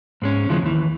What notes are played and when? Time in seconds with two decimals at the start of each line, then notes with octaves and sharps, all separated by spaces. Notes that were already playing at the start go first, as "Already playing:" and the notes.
0.22 G#2 G#3 C#4
0.49 D#2 C#3 E3 F3 G#3
0.62 D#2 E3